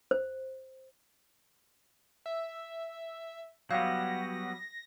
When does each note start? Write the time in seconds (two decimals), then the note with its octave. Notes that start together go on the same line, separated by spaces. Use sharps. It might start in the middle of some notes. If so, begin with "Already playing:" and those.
0.11 C5
2.26 E5
3.71 F#3 G3 B3 F5 G6 A#6